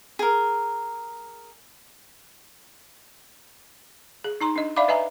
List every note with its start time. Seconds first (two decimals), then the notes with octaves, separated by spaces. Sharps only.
0.19 G#4 A#4
4.24 G#4
4.41 D#4 A#5 C6
4.56 D4 D#5
4.76 D5 E5 F5 B5 D6
4.88 B4 D#5 E5 G#5 A#5